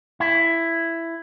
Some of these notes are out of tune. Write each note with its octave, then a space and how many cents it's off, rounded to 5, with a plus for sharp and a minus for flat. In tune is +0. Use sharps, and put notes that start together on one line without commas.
E4 +10